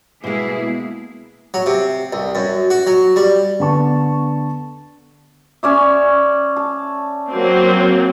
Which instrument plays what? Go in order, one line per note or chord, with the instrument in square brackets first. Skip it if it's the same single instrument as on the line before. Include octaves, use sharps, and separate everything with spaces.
[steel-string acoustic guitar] B2 G#3 [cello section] A#3 E4 G#4
[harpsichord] F#3
C3
C2
F#2
F#4
F#3
G3
[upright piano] D3 B3 A5 C#6
[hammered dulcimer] C#4 D5 E5
A5
[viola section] F#3 A#3 C4